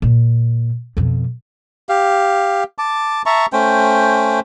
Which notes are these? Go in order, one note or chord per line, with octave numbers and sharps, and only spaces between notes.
A#2
F2 B2
G4 F5
A5 D6
E5 A5 A#5 C#6
A3 C#4 C5 G5